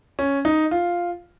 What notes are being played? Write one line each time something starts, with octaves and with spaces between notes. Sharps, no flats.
C#4
D#4
F4